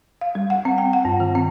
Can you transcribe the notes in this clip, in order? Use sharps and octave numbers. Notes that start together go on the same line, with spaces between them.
F5
G3
F#5
C4
G5
F#5
G2
D#3
C4